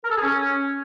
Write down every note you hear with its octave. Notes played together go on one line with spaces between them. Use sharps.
A#4
A4
G#4
C#4